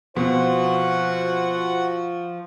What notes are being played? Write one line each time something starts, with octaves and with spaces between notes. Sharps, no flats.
B2 F3 C4 F#4 C5 F#5